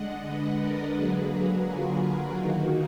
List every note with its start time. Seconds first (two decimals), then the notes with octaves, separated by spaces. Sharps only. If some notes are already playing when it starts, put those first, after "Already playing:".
Already playing: D3 G#3 D4 D#5 F#5
0.26 B4 D#5
0.61 A#4 D5
0.96 D3 F#3 A#3 G#4 B4
1.31 F#4 A#4
1.67 F4 G#4
2.02 F#4
2.37 D#3 A#3 D#4 F#4